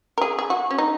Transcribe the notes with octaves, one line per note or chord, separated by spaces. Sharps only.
A#4
G#4
G#4
F#4
C#4
D#4